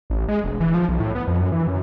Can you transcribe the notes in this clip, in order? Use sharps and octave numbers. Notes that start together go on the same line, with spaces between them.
A1
G#3
E1
E3
F3
B1
A2
B3
F2
F#2
E3
F#2